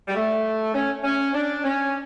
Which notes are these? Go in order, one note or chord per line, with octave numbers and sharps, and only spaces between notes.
G3
A3
C#4
C#4
D4
C#4